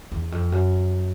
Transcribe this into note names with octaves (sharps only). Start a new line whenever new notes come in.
E2
F2
F#2